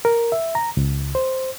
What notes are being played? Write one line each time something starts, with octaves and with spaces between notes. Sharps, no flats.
A#4
E5
A#5
C#2
C5